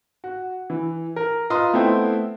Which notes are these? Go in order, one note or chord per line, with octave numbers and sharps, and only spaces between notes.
F#4
E3
A#4
F4 B4 D#5 A#5 C6 D#6
A3 B3 C4 E4 C5 G5